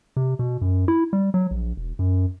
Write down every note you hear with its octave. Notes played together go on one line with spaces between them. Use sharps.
C3
B2
F#2
E4
G3
F#3
A#1
E1
F#2